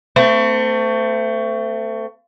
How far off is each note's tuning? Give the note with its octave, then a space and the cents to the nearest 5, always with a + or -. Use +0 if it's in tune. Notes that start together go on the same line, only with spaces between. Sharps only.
A3 +25 C4 -30